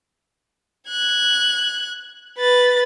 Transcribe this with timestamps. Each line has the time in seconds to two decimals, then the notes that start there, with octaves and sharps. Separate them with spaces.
0.89 F#6 G#6
2.38 B4 A6